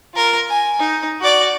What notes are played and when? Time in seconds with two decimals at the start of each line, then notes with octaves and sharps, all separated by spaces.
0.14 F4 A#4
0.49 G#5
0.80 D#4
1.21 F#4 D5